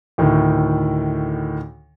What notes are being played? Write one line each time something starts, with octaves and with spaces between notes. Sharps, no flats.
D2 A2 D#3